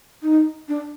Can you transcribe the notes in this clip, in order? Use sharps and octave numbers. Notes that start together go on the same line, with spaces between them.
D#4
D4